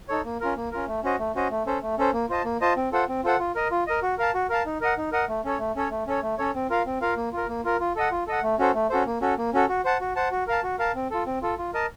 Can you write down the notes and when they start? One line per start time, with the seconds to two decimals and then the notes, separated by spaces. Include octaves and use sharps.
0.09 D#4 A4 C#5
0.25 A#3
0.41 C#4 F4 A#4
0.57 A#3
0.72 C#4 F4 A#4
0.88 A3
1.03 C#4 F#4 C5 D#5
1.19 A3
1.35 C#4 F#4 C5 D#5
1.50 A3
1.66 C#4 A4 C5
1.82 A3
1.98 C#4 A4 C5
2.13 A#3
2.29 F4 C5 D#5 A5
2.45 A#3
2.61 F4 C5 D#5 A5
2.76 C4
2.92 F4 A4 C5 F#5
3.08 C4
3.24 F4 A4 C5 F#5
3.39 F4
3.55 A#4 D#5
3.71 F4
3.87 A#4 D#5
4.02 F#4
4.18 A#4 F5 A5
4.34 F#4
4.50 A#4 F5 A5
4.65 D#4
4.81 A#4 D#5 F#5
4.97 D#4
5.12 A#4 D#5 F#5
5.28 A3
5.45 C#4 A4 C#5
5.59 A3
5.76 C#4 A4 C#5
5.91 A3
6.07 C#4 A4 C#5
6.22 A3
6.38 C#4 A4 C#5
6.55 C4
6.70 F4 A#4 F5
6.86 C4
7.01 F4 A#4 F5
7.17 A#3
7.33 F4 A#4
7.49 A#3
7.64 F4 A#4
7.80 F4
7.96 A4 D#5 F#5
8.11 F4
8.27 A4 D#5 F#5
8.43 A3
8.59 C#4 F#4 A4 C5
8.74 A3
8.90 C#4 F#4 A4 C5
9.06 A#3
9.21 C#4 F#4 A4
9.38 A#3
9.53 C#4 F#4 A4
9.69 F#4
9.85 C5 F#5 A5
10.01 F#4
10.16 C5 F#5 A5
10.31 F#4
10.47 A#4 F5 A5
10.63 F#4
10.79 A#4 F5 A5
10.95 C4
11.11 F4 A4
11.26 C4
11.42 F4 A4
11.58 F4
11.74 A#4 D#5 A5